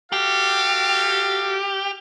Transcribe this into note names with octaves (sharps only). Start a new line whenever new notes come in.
F#4 G4 A4 F5